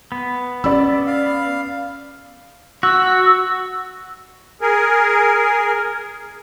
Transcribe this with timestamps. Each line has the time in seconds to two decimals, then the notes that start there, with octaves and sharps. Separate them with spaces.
0.12 B3
0.64 C#4 D5 B5 E6
1.07 F5
2.83 F#4 E6
4.61 G#4 A#4